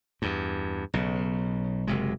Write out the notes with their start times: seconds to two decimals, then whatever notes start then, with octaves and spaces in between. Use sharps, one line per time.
0.22 E2 G2
0.94 B1 C#3
1.87 F#1 C3 G#3